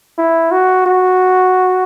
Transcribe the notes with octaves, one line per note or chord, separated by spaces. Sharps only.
E4
F#4
F#4